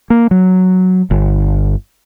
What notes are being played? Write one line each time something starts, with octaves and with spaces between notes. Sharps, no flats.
A#3
F#3
G1